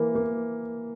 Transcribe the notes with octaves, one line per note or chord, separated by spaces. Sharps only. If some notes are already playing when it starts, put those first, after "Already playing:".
Already playing: E3 A#3
A#3